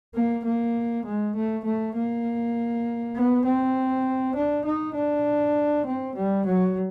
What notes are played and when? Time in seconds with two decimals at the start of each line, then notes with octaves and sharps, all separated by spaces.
0.15 A#3
0.44 A#3
1.05 G#3
1.35 A3
1.65 A3
1.95 A#3
3.15 B3
3.45 C4
4.35 D4
4.65 D#4
4.95 D4
5.86 C4
6.15 G3
6.46 F#3